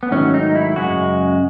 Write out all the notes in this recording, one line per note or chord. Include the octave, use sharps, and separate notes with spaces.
B3
G#2 D#3 F#3 A3 C#4
D#4
E4
F#2 C#3 G#3 F#4